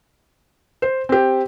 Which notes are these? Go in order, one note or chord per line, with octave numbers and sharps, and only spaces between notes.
C5
C4 G4